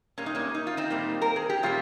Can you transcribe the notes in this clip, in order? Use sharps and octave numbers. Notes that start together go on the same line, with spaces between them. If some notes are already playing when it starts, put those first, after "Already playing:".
A#2 G3 A#3 C#4
D#4
A#3 C#4
D#4
F4
C4 D#4
A#2 G3 A#3
A#4
G#4
G4
A#2 G3 A#3 C#4 F4